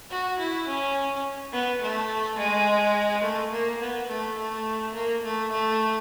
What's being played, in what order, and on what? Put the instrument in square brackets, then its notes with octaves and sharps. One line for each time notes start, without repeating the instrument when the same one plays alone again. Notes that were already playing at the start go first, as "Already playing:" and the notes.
[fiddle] F#4
E4
C#4
B3
A3
G#3
A3
A#3
B3
A3
A3
A#3
A3
A3